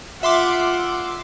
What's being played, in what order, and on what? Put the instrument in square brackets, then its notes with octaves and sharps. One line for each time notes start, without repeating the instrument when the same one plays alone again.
[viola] F4 F#5 [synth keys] E5 C6 D6